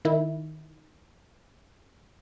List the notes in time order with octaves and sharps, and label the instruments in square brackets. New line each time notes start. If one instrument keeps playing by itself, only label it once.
[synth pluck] D#3 E4